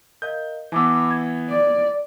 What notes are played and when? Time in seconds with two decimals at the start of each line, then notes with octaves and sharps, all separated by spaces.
0.22 A#4 D#5 F5 G6
0.72 E3 B3 A5 D6 E6
1.11 G#6
1.49 D5